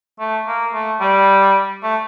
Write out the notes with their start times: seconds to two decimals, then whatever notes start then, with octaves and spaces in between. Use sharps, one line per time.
0.20 A3
0.47 A#3
0.73 A3
1.00 G3
1.83 A3